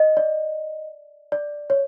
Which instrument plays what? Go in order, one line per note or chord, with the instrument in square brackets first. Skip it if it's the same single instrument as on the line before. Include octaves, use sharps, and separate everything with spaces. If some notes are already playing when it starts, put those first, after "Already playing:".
Already playing: [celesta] D#5
D5
D5
C#5